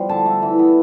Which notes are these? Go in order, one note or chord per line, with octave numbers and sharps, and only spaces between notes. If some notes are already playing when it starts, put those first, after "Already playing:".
Already playing: F3 G3 B3
D3 A5
A3
E3
B3